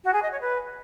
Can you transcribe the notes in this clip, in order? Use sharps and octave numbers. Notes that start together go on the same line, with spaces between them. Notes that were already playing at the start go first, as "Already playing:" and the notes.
F#4
G#4
D#5
C#5
B4